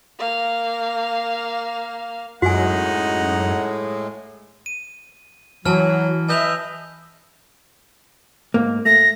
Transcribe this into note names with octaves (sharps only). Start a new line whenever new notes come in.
A#3 F5
F#2 A2 G#3 D#4 F#4 F#5 G#5
D#7
E3 F#3 G#5 A5 F6
B4 D#5 E5 G#5 G6 F7
G#2 A#3
A3 A#6